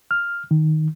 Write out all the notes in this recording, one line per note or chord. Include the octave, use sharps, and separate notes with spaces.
F6
D#3